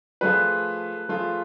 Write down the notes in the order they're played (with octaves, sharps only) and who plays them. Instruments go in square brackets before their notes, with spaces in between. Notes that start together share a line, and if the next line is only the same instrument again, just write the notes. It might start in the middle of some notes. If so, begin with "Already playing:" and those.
[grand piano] F3 A3 F4 G#4 [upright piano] B4
[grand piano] F3 A3 F4 G#4